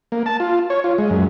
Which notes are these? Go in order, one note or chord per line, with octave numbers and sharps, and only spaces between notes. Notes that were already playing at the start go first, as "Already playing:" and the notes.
A#3
A5
F4
C#5
F4
G#3
F#2